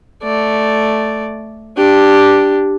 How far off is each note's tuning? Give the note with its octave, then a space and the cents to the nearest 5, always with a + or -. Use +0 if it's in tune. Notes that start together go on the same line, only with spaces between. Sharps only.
A3 +0 D5 +0
D4 +0 G4 +0